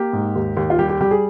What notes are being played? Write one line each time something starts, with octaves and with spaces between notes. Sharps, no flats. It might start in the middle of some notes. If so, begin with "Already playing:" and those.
Already playing: A#3 G4
G#2
D#2
D#2
F4
G3 G4
G4
G3 G4
G#4